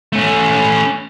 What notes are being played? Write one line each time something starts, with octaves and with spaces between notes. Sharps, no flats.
A3 C#4